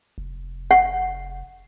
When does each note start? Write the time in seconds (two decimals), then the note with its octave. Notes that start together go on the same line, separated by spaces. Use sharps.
0.18 F1
0.71 F#5